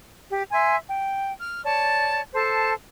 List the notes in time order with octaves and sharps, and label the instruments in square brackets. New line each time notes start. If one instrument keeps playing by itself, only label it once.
[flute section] G4
E5 G#5 C6
G5
F6
C#5 D5 A5
A4 C5 A5